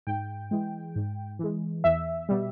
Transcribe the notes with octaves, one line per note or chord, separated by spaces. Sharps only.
G#2 G5
E3 G#3
G#2
E3 G#3
E2 E5
B2 G3